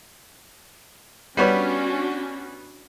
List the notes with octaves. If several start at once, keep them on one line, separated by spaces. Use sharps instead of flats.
G3 B3 C#4 D4 F#4 C#5